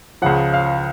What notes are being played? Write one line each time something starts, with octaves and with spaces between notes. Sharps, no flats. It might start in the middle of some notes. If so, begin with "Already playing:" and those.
C#2 C#3 F3 F#5
F5